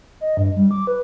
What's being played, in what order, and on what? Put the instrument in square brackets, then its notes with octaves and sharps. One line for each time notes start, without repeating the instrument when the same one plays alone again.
[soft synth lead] D#5
G2
G3
D6
B4